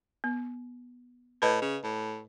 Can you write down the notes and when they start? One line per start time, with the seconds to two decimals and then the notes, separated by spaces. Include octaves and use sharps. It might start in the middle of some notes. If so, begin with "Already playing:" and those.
0.24 B3
1.42 A2 B4 D#5
1.61 C#3
1.83 A2